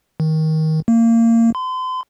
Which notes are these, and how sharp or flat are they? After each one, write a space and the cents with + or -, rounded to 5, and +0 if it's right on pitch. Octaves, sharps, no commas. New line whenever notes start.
D#3 +20
A#3 -25
C6 -40